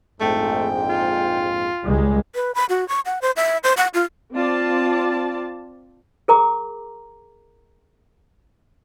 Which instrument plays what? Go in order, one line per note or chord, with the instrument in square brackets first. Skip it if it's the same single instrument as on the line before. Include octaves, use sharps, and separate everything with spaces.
[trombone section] A#1 F2 G#2 [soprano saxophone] A3 [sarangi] G5
[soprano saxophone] F4
[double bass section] C#2 G3 G#3
[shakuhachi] B4
B5
F#4
C#6
F#5
C5
E5
C5
F#5
F4
[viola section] C4 F4 D5 A5
[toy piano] G#4 A#4 A#5 D6